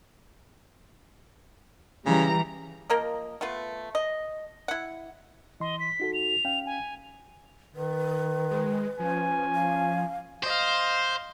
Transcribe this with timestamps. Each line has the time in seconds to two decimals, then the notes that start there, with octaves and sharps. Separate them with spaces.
2.06 C#3 E3 G3 A#5
2.90 F3 A#3 A#4 D#5
3.41 A3 B3 F4 B4
3.95 D#5
4.68 E4 F#5
5.60 E3 D#5 C6
5.80 B6
6.00 D#4 F#4 A4
6.14 F7
6.45 C#4 F5 G5
6.66 G#5
7.76 D#3 B4
8.51 G#3
8.99 F3 C#4 G#5
9.55 F5
10.43 C5 D#5 F5